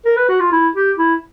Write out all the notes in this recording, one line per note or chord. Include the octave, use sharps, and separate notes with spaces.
A#4
B4
F#4
F4
E4
G4
E4